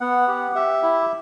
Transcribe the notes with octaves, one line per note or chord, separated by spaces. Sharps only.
B3 F#5
G4
G4 E5
E4